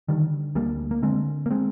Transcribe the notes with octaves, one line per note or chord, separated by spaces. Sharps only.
D3 D#3 G3
D2 G3 A#3
A#3
D3 G#3 C4
A#3
G#3 C4